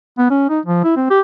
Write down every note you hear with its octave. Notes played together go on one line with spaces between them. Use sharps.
B3
C#4
D#4
F3
E4
C4
G4